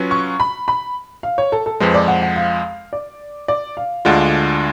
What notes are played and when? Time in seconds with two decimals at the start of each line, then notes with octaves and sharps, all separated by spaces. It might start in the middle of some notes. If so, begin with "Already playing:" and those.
Already playing: F#3 C#4 F4 B4
0.11 C#6
0.40 B5
0.68 B5
1.23 F5
1.38 C#5
1.52 A4
1.66 A4
1.80 F2 F3 G#3 B4
1.94 D5
2.08 F#5
2.22 F#5
2.36 F5
2.93 D5
3.48 D5
3.77 F5
4.05 D2 D3 G#3 D4 F4 F#5